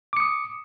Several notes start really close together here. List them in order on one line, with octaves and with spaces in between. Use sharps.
D6 C#7 D#6